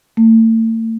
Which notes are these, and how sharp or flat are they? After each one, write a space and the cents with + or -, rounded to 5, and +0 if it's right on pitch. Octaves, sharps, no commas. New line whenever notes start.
A3 +40